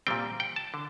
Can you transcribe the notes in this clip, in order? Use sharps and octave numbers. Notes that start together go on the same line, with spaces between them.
A#2 G3 C4 G5
G5
A5
D3